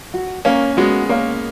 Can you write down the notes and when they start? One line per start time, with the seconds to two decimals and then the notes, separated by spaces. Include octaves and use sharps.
0.14 F#4
0.45 A#3 C#4 A#4 C#5 F5
0.77 G#3 B3 F#4
1.09 A#3 A#4 C#5 F5